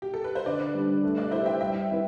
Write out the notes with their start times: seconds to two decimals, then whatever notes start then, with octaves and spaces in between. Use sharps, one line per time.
0.02 G4
0.14 A4
0.24 B4
0.35 C5
0.46 D3 B4 D5
0.74 G3 D4
1.04 A3
1.17 B4 D5
1.31 E4 G4 C5 E5
1.46 E5 G5
1.60 G3 E5 G5
1.89 C4 E4 B4